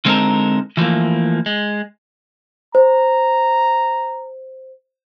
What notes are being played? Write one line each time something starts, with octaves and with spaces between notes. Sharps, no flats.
D3 G#3 C4 D#4 A4 A#4
E3 F3 A3 A#3
G#3
C5 A#5